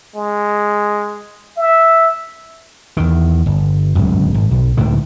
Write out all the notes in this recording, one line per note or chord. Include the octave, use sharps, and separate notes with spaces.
G#3
E5
E2 D#3
G1
D1 G1 C#2 F#2
G#1
B1
C#2 A2 D3 D#3